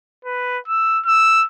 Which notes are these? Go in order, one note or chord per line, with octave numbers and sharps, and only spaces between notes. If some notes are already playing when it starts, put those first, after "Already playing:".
B4
E6
E6